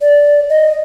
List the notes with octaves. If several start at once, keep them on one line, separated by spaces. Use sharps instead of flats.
D5
D#5